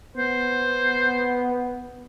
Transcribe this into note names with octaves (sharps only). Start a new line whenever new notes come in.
B3 C5